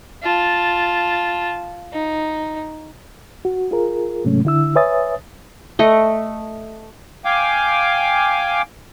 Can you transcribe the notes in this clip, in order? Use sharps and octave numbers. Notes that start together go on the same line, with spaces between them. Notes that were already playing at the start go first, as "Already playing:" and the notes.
F4 A5
D#4
F#4
F4 G#4 A#4
G#2 C3 F#3 G#3 A3 C#4
D3 E4 E6
B4 C#5 E5 G#5 D#6 A6
A3 D#5
F5 G5 G#5 D6